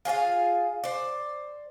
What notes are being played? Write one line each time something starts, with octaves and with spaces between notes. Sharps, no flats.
F4 G#4 C5 F5
C5 D5